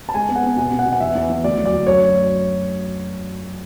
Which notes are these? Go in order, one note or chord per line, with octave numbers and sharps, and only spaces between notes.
A5
G#3 G#5
B3
F#5
B3
B2 G#5
B2
F#5
B2
F#5
E2 E5
E2
E2
D2 D5
F#3
D5
D2
F#2 C#5